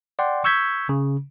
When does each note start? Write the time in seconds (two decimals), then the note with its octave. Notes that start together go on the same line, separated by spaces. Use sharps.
0.19 D5 F#5 G5 C6
0.44 C#6 E6 G6 G#6 B6
0.89 C#3